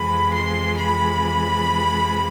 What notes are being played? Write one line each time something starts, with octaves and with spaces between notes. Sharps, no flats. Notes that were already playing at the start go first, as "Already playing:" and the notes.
Already playing: F2 C3 E3 G#3 B5
C6
B5